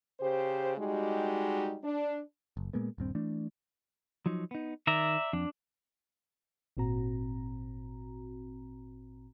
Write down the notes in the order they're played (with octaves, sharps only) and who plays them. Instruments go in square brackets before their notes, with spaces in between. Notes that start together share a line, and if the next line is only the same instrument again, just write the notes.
[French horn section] C#3 G4 C5
G3 G#3 D#4 F#4 G4
D4
[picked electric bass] F#1
A#2 G#3 A#3 B3
D#1 G2 C4
E3 A3 D4
[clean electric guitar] F3 F#3 D#4
B3 D#4
[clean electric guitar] D#3 [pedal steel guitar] D5 E5 A#5
[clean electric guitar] F2 [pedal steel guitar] D4
[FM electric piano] G#1 A#2 C4 F#4 A#5